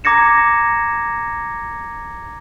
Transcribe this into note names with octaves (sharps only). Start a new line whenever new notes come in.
A#5 D6 G#6 A#6 C#7 E7